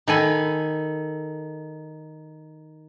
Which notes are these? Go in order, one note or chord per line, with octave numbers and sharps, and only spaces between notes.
D#3 A4 G#5 B5